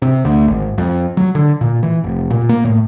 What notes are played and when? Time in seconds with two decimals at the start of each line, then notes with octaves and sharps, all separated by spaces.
0.02 C3
0.25 D2
0.48 G#1
0.78 F2
1.17 F#3
1.35 D3
1.61 A#2
1.83 E3
2.04 F1
2.30 A#2
2.49 A#3
2.64 A2